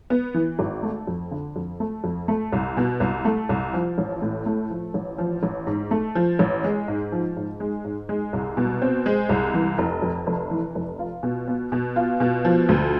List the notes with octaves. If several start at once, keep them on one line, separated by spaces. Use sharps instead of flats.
B3
E3
G#1
A3
F2
D3
F2
A3
F2
A3
C2
B2
C2
A3
C2
F3
A1
A2
A3
F3
A1
F3
A1
G#2
A3
F3
A1
G#3
G#2
F3
G#2
G#3
G#2
G#3
C2
B2
C4
G#3
C2
E3
F1
F2
F1
E3
F1
F4
B2
B3
B2
F4
B2
F3
D2